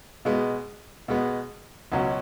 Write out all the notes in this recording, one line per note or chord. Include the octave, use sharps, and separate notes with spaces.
B2 G#3 B3
B2 G#3 B3
C#2 B2 F#3 C#4